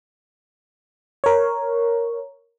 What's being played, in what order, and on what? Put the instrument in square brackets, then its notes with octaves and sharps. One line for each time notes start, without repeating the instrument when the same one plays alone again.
[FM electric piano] A#4 C#5